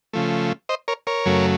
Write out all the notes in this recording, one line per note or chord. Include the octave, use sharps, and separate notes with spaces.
C#3 F3 A3
C5 D#5
A#4 C#5
A#4 C#5
F#2 C#3 F#3 A3